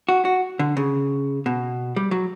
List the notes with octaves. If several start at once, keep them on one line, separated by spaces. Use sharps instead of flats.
F#4
F#4
D3
C#3
B2
G3
F#3